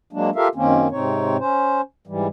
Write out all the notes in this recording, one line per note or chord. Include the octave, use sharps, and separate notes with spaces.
F#3 G#3 A#3 D4
F4 G4 A4 A#4 E5 F5
F#2 D#3 A#3 C4 C#4
G#2 C3 C4 D#4 C#5
C#4 C5
G#2 E3 G3